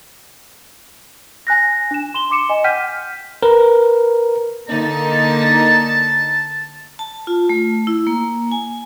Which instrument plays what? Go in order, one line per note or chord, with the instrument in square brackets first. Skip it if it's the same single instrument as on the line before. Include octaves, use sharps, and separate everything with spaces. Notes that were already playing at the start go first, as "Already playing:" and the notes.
[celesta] G#5 F#6 A#6
D4 E7
C6 E7 G7
C6 D6 C#7 E7
D#5 G#5
F#5 G5 F6 G6 B6 D#7
[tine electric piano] A#4 B4
[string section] D3 A#3 D#4 [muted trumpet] A5
[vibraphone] A5
F4
A3
E4
A#3
G#5